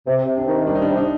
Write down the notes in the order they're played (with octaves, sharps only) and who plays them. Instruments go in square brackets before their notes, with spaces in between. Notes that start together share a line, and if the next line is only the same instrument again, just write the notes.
[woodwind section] C3 [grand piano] C4
[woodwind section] C3
[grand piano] D4
[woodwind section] D#3
[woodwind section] G3 [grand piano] D4
[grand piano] D#4
D4
[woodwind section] C3
[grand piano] D#4